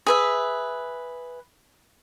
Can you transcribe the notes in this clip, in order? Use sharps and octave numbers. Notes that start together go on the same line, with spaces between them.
G#4 B4 E5